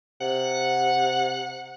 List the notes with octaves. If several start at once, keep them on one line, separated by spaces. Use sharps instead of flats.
C3 F#5